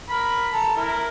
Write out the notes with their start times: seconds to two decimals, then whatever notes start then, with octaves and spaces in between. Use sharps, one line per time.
0.09 A#4 B5
0.52 A4 A#5
0.76 E4 A#4